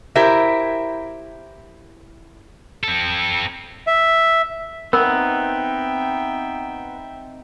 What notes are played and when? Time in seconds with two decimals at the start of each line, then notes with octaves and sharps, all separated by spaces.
0.16 E4 G4 A#4 C5 E5
2.83 C4 A4
3.87 E5
4.93 B3 C4 D#4 A#4 E5 G5